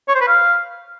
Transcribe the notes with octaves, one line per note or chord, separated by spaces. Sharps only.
C#5
C5
B4
F5